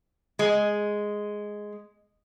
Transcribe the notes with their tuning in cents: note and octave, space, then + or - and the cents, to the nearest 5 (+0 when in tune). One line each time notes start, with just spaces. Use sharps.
G#3 +0